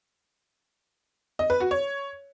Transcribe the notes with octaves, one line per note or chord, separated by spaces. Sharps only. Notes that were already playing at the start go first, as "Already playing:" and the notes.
D#5
B4
F#4
C#5